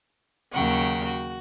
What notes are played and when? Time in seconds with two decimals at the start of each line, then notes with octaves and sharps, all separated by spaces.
0.53 D#2 C#3 F#3 F#5 G5 C#6
1.06 F#4